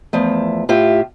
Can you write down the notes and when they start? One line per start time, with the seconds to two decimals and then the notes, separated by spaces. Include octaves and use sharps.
0.13 E2 F3 A3
0.69 A2 F4 G4 E5